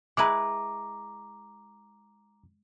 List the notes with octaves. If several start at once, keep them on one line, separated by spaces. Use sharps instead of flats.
G#3 E4 B4 A#5 D6